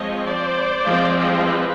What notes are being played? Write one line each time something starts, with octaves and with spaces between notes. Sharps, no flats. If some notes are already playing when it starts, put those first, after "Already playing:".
Already playing: F3 G#3 C4 C#5 D#5
C5 D5
F3 G#3 C4
B4